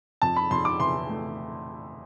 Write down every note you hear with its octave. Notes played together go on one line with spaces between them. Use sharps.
F2 A5
B5
F2 C6
D6
E3 C6
A3